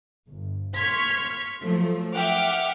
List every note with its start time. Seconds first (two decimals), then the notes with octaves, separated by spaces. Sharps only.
0.28 G1
0.75 C6 C#6 F6 G#6 B6
1.62 F3 F#3 A3
2.15 E5 F#5 G5 D6 F6